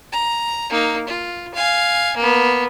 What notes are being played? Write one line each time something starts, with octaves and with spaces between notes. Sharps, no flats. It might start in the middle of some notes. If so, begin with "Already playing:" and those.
A#5
A#3 D#4
F4
F5 G#5
A#3 B3